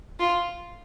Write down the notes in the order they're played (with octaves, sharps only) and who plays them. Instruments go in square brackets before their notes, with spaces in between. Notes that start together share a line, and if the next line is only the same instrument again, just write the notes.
[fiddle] F4